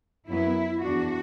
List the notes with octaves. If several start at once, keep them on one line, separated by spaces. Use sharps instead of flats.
F#2 F#3 B3 E4
E2 E3 D4 F#4